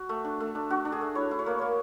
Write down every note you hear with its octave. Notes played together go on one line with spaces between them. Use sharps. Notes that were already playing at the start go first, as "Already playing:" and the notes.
Already playing: F#4
A3
D4
A3
D4
D4 F#4
D4
G#4
A3
E4 C#5
E4
C#5
A#3 D5
A#3 C#5